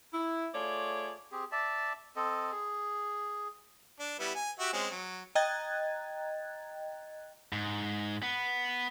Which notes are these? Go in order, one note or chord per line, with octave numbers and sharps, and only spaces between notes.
E4
A3 F4 G#4 C#5 D5
C4 G4 G#4
D5 E5 A5
C4 A4 D#5
G#4
D4
G3 B3 E4
G#5
F#4 G4 E5
G#3 C4 C#4
F#3
D#5 G5 A#5 F#6 G#6 A6
G#2
B3